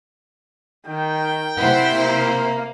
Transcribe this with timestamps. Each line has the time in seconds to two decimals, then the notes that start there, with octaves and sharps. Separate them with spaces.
0.86 D#3 G5
1.57 C3 E4 C5 F#5
1.93 A#3